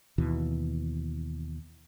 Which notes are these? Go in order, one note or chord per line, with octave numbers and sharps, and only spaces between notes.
D#2 B2 E3